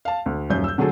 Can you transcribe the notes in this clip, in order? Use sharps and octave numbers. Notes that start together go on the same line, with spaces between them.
F5 A5
D2
D#1 F#2 G6
E6 G6
D3 F#3 A3 G#4 A4